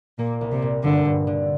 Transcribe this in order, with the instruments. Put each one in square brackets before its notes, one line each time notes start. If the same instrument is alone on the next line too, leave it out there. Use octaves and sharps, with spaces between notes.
[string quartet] A#2 [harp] A#3
[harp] C2
[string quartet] C3
[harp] A#2
[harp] G2 [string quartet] D3
[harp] G2
D3